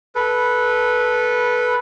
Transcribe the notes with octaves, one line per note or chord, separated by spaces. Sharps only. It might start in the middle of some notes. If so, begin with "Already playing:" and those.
A4 B4